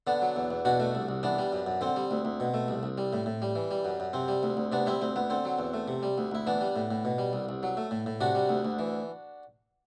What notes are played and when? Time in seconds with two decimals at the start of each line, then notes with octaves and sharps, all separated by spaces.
0.07 D3 B3 D4
0.22 F#3
0.36 E2
0.51 E2
0.65 B2 D4 F#4
0.80 A3
0.95 C2
1.09 C2
1.23 E3 B3 D4
1.39 G3
1.52 F#2
1.66 F#2
1.81 D3 C4
1.96 G3
2.11 D2
2.25 D2
2.40 B2
2.54 A3
2.68 C2
2.83 C2
2.98 G3
3.13 A2
3.26 A2
3.42 G3
3.56 E3
3.71 G3
3.85 F#2
4.00 F#2
4.13 C3 C4
4.28 G3
4.43 D2
4.57 D2
4.72 C3 B3 D4
4.86 G3 C4 E4
5.01 D2 C4
5.16 D2 B3
5.30 D3 C4
5.45 F#3
5.59 E2
5.74 A3
5.88 C3
6.03 G3
6.18 D2
6.31 D2 E4
6.47 E3 B3 D4
6.61 G3
6.76 A2
6.91 A2
7.05 B2
7.18 G3
7.33 C2
7.49 C2
7.63 F#3
7.77 A3
7.91 A2
8.06 A2
8.21 C3 D4 F#4
8.35 G3
8.49 D2
8.65 D2
8.79 E3